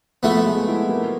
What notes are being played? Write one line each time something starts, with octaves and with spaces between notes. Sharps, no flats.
F3 A3 B3
G#3
E4
A#3